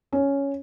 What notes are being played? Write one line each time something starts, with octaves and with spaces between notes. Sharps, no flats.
C#4